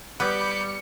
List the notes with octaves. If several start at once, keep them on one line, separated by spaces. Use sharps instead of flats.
G3 B3 B5 D6 G6 C#7